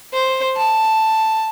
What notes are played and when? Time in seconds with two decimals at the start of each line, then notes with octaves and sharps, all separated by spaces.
0.13 C5
0.56 A5